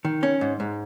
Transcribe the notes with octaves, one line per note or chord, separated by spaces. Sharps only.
D#3
C#4
G#2
G#2